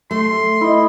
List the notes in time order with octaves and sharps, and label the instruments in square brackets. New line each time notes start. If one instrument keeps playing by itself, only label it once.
[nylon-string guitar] A3 [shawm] C6
[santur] E4 D#5